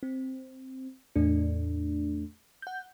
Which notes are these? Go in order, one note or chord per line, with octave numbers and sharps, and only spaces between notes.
C4
E2 A2 A3 D4
F#5 G6